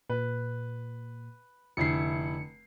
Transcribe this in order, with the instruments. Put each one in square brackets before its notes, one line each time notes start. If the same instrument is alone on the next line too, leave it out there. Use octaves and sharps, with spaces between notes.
[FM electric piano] A#2 [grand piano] B4
[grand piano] F1 E4 C7 [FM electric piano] D3 C#7